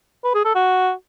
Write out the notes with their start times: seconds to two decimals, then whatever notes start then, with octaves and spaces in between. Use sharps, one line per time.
0.24 B4
0.35 G#4
0.45 A4
0.55 F#4